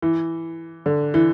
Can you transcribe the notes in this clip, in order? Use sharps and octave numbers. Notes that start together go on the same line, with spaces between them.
E3
D3
E3